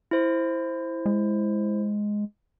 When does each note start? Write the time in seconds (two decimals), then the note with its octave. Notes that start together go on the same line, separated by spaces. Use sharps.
0.11 E4 C5
1.06 G#3